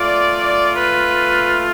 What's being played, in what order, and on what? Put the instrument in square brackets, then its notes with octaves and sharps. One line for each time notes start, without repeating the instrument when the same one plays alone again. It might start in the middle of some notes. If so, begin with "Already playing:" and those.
Already playing: [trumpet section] A3 F4 D5
B4